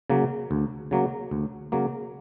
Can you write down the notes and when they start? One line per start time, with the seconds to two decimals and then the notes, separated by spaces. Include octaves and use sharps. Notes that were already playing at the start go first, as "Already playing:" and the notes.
0.10 C#3 F#3 A#3
0.51 D2
0.91 C#3 F#3 A#3
1.31 D2
1.72 C#3 F#3 A#3